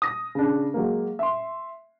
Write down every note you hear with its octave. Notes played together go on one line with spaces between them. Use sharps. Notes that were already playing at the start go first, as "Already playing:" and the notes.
D#6 A#6
C#3 D4
F#3 G#3 A#3
E5 C6